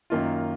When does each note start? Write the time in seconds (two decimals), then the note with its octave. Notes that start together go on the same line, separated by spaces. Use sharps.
0.10 F#2 D#3 A#3 F4